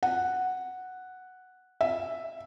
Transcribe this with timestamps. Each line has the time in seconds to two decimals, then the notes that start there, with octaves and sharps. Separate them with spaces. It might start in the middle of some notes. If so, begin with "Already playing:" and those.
0.03 F#5
1.81 E5